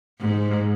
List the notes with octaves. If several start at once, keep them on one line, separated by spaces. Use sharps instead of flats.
G#2